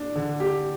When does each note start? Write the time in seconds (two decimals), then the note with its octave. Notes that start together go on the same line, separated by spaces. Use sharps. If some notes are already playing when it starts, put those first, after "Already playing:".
Already playing: D4
0.15 D3
0.40 G4